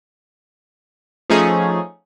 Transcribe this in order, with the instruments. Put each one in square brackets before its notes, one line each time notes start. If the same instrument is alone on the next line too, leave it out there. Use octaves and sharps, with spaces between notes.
[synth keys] F3 A3 C#4 D#4 G#4